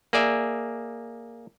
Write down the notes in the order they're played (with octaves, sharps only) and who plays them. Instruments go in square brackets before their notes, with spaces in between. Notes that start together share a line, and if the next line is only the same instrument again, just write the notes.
[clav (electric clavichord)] A#3 G#4 D5 E5